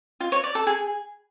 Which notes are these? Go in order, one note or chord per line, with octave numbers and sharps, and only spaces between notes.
F4
C#5
D5
A4
G#4